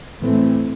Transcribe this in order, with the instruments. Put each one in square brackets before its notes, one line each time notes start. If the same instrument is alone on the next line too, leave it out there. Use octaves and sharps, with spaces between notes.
[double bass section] A2 E3 A3 C4